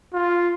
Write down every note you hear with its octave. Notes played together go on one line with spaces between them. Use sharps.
F4